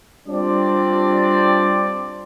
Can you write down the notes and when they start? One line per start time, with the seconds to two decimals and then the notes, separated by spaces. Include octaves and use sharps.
0.28 G3 C4 D4 F4 D5